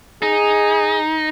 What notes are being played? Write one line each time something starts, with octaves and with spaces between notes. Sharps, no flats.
D#4 G#4